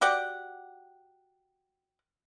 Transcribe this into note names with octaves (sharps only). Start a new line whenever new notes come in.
F#4 G4 D5 F#5